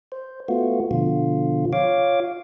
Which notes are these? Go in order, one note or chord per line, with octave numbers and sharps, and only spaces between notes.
C5
A3 B3 F4 F#4
B2 D3 F3 F4
F4 C#5 F5 D6